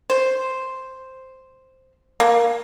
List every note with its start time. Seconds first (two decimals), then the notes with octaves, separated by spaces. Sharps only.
0.10 C5
2.20 A#3